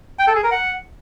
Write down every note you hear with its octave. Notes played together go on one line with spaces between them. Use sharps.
G5
A4
G#4
A#4
F#5